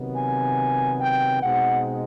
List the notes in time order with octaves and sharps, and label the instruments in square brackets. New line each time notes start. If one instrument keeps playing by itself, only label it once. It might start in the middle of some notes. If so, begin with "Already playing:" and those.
Already playing: [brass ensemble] C3 D#3 F#3 B3
G#5
G5
B2 G#3 C4 D#4 F#5